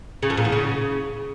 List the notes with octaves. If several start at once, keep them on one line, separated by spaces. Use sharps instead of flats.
C#3
F2
A#2
E2
C#3